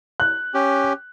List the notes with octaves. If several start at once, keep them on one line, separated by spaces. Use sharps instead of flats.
F#6
C#4 G4